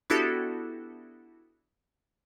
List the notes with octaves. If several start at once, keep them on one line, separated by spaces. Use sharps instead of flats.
B3 D4 E4 F#4 G4 A4